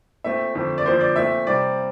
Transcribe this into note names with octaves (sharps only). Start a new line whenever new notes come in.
A#2 A3 C4 E5
F2 D3 A3 C4
D5
F2 D3 F3 A#3 C5
D5
A#2 A3 C4 E5
C3 G3 C4 D5